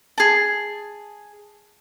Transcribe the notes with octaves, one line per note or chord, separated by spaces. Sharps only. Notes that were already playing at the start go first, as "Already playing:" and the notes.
G#4 A5